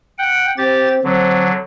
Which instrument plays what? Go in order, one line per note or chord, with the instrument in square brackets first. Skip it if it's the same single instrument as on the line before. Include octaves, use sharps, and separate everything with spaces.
[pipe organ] F#5 G5
[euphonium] C4 [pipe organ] G4 A6
[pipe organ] D3 F#3 [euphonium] C4